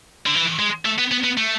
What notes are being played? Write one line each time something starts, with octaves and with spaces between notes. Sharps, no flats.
D3
E3
G#3
A3
B3
B3
B3
A3